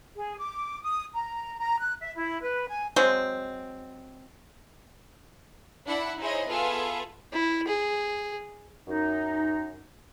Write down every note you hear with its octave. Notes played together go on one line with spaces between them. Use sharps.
G#4
D6
D#6
A#5
A#5
F#6
E5
E4
B4
G#5
F#3 G#3 C4
D4 E4 F#5 B5
D#4 E4 G#4 C5 C#5 D#5
B3 F4 G#4 A4 B4 E5
E4
G#4
F#2 D#4